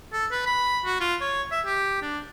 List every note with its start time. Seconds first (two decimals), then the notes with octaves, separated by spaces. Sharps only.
0.13 A4
0.31 B4
0.46 B5
0.86 F#4
1.00 F4
1.21 C#5
1.52 E5
1.66 G4
2.02 D4